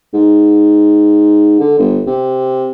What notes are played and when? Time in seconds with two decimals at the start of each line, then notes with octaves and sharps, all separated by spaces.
0.14 G#2
1.60 D3
1.79 G1
2.07 C3